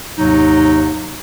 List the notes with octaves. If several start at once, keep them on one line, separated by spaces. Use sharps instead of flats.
D#2 G#2 C3 F#3 D#4